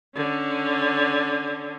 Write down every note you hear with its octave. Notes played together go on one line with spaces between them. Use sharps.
D3 C#4